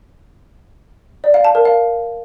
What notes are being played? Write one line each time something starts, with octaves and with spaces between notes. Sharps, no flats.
D5
F5
A5
A#4
F5